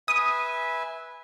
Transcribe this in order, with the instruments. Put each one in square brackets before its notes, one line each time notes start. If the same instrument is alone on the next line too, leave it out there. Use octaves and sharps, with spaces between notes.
[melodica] B4 E5 G#5 [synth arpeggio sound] D#6